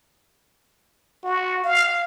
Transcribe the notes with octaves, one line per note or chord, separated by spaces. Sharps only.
F#4
F5